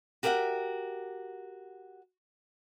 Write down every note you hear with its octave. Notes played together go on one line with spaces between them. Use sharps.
F#4 G4 A#4 D5 E5 F#5